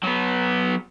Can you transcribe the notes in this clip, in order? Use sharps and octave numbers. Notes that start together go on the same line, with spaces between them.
F#3 B3